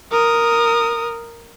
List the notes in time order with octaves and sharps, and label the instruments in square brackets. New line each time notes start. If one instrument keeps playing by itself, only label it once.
[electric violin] A#4 D#6